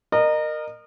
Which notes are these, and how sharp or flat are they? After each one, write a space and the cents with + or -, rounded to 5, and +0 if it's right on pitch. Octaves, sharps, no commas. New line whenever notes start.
A#4 +0 D#5 -30